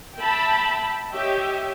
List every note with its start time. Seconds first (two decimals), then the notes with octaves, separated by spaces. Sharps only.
0.17 E5 G5 A5 B5
1.11 G4 C#5 D#5 E5 G5